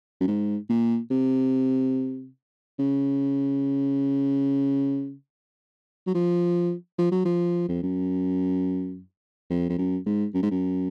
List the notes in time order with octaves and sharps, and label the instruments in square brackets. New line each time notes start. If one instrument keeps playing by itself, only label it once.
[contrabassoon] F#2
G#2
A#2
C3
C#3
F#3
F3
F3
F#3
F3
F2
F#2
F2
F2
F#2
G#2
F#2
G#2
F#2